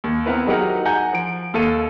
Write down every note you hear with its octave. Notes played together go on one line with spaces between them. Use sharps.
D#2
B3 C4 E4 A#4 B4
F#3 G#3 D#4 G4 A#4 F#5
F#5 G#5 A#5 G6
F3 D7
D#2 A4 F5 D#7